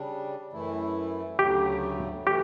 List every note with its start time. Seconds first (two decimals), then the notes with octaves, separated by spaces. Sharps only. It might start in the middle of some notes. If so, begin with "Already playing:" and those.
Already playing: C#3 G3 D4
0.53 F#2 E3 A3 E4
1.39 D2 C#3 F#3 A3 G4
2.26 E3 A3 G4